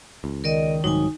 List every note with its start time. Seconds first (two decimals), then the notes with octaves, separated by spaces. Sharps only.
0.24 C#2
0.44 D#3 A#4 D5 D#5
0.84 C2 G#2 F#3 D#4 G#5